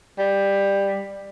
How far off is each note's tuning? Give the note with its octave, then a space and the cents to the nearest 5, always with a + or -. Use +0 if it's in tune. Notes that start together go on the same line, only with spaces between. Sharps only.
G3 +15